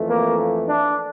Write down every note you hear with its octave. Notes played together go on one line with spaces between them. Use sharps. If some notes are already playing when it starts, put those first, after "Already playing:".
Already playing: F2 E3 A3
A#3
D4